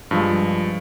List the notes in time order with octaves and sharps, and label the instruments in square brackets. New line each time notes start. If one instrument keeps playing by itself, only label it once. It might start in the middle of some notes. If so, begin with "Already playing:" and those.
[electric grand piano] G2 F3 G#3